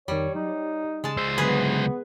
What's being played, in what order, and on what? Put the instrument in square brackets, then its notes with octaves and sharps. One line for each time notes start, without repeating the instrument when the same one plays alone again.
[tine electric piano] F2 D#3 [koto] G3 [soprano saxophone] C#5
[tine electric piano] F#3 [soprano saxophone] D#4
[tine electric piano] C#5
[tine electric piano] C#3 G#5 [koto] G#3 A5
[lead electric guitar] C#2 C5 [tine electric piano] E6
[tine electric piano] D3 F#3 G#3 [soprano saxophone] B3 [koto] G#4 B4